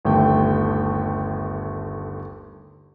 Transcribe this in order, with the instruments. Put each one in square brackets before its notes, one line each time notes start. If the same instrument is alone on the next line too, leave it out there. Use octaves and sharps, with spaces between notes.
[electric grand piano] G1 D#2 A3 G5